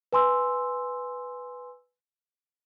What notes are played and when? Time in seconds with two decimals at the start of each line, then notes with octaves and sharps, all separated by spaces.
0.13 B4 G#5 C6 E6